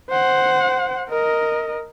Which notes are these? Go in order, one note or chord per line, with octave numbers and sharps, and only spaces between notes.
C5 F#5
A#4 D#5